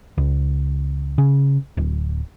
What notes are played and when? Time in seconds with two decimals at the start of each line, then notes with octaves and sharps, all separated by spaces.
0.18 C#2
1.18 C#3
1.77 D1